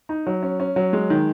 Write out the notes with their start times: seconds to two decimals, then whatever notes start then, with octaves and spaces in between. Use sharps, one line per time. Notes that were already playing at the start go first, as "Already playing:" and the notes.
0.09 D#4
0.27 F#3
0.43 C#4
0.60 C#4
0.76 F#3
0.93 G#3
1.10 D#3